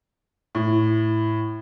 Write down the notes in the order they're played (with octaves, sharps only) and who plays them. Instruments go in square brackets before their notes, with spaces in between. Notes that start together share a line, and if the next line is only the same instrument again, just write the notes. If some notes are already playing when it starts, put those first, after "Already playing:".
[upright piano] A2